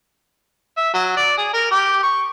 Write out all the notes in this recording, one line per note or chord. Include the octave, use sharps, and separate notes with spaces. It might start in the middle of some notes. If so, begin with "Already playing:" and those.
E5
F#3
D5
G#4
A#4
G4
C#6